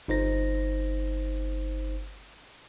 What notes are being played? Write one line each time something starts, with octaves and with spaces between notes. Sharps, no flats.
G1 D#4 C5 A#6